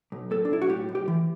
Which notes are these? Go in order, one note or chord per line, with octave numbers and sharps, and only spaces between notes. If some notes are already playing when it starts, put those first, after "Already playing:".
B1
A2 A4
D4
B1 E4
F#4
A2 G4
B1
G4
E3